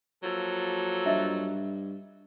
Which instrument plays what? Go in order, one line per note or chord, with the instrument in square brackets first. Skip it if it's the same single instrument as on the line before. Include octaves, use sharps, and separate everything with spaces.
[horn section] F3 A#3 A4 [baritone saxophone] F#3
[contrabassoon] G2 [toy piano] D#5 E5